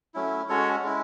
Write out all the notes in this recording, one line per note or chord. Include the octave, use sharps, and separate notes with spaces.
F#3 A3 C#4 E4
G#3 C#4 F#4 A4 C#5
G#3 C#4 E4